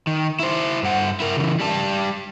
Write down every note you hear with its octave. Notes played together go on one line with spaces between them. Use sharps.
D#3
E4 C5
G2 F#5
E4 A#4
C#3 E3
G3 A5